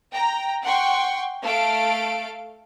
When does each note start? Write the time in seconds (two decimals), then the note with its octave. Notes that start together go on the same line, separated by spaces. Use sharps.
0.13 G5 A#5
0.63 F#5 G5 C6 C#6
1.45 A3 A4 F5 D7